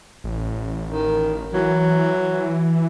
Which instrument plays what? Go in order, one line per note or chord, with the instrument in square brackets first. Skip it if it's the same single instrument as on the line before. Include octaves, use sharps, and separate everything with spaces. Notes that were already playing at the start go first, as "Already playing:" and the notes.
[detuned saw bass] A1
[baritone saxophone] D#3
[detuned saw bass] E3 [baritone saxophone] F#3